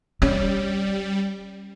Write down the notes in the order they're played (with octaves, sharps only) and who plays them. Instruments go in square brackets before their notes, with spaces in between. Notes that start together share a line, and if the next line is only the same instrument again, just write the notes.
[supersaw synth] G3 [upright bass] C#4